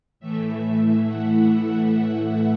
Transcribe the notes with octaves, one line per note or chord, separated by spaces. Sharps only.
A2 E3 A3 E5
F#5
E5
F#5
E5